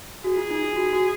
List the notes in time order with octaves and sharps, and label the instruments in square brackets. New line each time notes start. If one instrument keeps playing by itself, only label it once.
[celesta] F#4 [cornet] G#4
[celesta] F4
D#4
F4
F#4
F#4